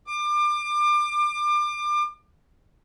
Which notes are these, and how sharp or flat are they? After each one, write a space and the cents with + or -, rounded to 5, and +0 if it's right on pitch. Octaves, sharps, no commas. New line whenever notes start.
D6 +30